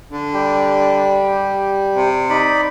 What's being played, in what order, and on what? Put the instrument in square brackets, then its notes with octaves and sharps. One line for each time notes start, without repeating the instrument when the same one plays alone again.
[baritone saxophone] D3
[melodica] G3 G4
[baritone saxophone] C3
[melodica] D#4 D5 B5